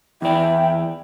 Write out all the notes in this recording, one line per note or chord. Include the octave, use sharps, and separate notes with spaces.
E2 E4 D5 G5